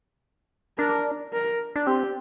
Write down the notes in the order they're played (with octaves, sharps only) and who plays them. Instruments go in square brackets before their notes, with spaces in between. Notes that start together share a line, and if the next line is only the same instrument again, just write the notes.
[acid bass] D4 [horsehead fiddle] A#4
[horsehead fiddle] A#4
[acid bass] D4
[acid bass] C4 [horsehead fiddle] G4